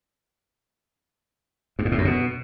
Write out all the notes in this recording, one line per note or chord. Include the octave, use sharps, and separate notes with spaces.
G2
G#2
A2
F#2
B2